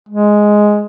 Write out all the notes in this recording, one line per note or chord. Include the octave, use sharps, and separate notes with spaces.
G#3